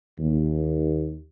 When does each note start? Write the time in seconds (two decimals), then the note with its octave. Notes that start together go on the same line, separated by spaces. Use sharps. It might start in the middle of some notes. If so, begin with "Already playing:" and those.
0.20 D#2